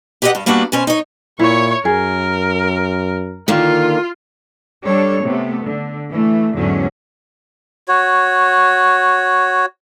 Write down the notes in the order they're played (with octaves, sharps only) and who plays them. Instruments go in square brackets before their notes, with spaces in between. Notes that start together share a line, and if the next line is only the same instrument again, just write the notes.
[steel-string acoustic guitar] E4 G4 B4 D5 D#5 F#5
G2
G3 A#3 B3 D4 F#4
B2 C#4 C5
D#4 C#5
[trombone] A#2 [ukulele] E4 [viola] C#5 C#6
[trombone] F#2 [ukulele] G#4 [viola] A#4
[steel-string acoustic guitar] D3 D#3 A#3 [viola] F4
[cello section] G3 D4 A4 C#5
C3 A3 B3
D3
E3 A3
E2 G#2 D3 F#3 C#4
[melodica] F#4 C#5